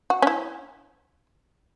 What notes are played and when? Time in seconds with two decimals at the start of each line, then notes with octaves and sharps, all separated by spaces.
0.10 F#4
0.22 C#4
0.27 E4